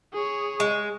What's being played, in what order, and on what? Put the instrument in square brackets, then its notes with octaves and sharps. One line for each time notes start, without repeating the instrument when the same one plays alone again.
[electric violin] G#4 C#5
[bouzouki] G#3